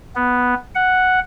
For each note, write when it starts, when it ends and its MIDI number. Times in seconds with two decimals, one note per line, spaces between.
0.16 0.54 59
0.75 1.20 78